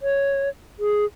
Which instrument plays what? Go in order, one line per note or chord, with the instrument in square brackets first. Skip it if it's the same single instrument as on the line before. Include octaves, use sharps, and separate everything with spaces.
[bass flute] C#5
G#4